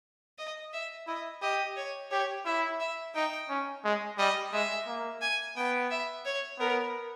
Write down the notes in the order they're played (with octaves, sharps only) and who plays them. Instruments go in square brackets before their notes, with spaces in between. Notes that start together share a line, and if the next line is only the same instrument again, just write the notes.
[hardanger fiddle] D#5
E5
[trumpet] E4 [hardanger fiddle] D#5
[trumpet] G4 [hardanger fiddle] D#5
[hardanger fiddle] C#5
[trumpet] G4 [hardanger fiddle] C#5
[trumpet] E4 [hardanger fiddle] E5
[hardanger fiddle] E5
[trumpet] D#4 [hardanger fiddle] G5
[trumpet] C#4
G#3
[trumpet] G3 [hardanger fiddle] D#5
[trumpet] G#3 [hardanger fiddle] E5
[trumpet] A#3
[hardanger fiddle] G#5
[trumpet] B3 [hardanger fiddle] G5
[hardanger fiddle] E5
C#5
[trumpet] B3 [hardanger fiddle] A#4